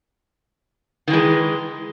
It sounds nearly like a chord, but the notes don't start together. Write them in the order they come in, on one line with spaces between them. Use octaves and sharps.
D#3 E3 G#3